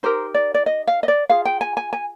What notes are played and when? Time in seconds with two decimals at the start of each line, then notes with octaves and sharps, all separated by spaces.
0.03 D#4 G4 A#4 C5
0.34 D5
0.54 D5
0.66 D#5
0.87 F5
1.03 D#5
1.08 D5
1.29 F4 G#4 F5
1.45 G5
1.61 G#5
1.77 G#5
1.93 G#5